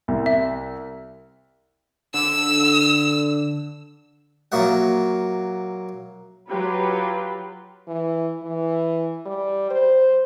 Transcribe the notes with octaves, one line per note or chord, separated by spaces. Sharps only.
C2
E5
D3 E6
A#2 F#3 A#3 F#4 E5 F#5
F#3 F4 G4 B4
E3
E3
G3
C5